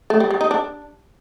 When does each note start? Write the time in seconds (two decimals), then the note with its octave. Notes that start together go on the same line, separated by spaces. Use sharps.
0.10 A3
0.20 G3
0.30 G3
0.41 D#4
0.51 D4